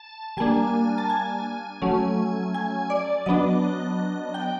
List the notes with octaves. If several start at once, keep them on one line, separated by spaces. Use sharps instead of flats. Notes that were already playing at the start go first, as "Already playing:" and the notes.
Already playing: A5
G3 A#3 D4 G#5
A5
G#5
F#3 A3 C#4
G#5
D5
F#3 B3 D4 D#5
G5